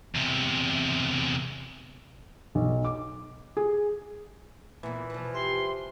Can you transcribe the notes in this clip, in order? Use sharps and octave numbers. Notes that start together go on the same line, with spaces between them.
E2 C3
B1
D6
G#4
A#2 E3 B3
B2 F3
G4 E5 G5 C6